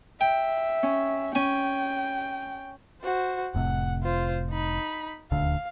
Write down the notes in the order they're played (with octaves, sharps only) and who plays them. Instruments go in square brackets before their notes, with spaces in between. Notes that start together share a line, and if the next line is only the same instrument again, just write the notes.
[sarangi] E5 [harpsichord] G5
[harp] C#4
[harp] C#4 [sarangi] G5 [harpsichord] G#5
[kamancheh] F#4 C5
[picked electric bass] F1 A2 C3 [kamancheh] F#5
[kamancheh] F4 C5
D#4 B5
[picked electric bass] D#1 D2 D3 [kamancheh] F5